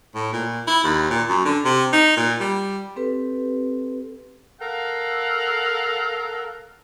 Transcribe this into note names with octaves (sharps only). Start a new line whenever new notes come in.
A2
A#2
E4
D#2
A#2
F#2
D3
C3
D#4
A#2
G3
C4 G4 A4 B4
A4 A#4 F5 F#5